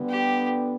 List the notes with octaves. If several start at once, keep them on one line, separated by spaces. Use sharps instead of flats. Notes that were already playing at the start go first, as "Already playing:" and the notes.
Already playing: D3 G3 B3
G4